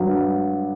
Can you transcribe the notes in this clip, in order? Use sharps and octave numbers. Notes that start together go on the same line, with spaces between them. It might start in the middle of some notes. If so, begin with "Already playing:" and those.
Already playing: G2 F#3